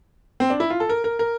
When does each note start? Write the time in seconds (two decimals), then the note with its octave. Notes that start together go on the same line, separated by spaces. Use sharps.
0.40 C4
0.50 D4
0.60 E4
0.70 F4
0.80 A4
0.89 A#4
1.04 A#4
1.19 A#4